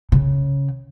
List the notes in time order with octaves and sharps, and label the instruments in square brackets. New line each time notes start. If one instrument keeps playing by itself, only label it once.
[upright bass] C#3